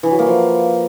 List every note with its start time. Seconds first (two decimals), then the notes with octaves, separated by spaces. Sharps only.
0.03 E3
0.11 F#3
0.19 A#3
0.27 F3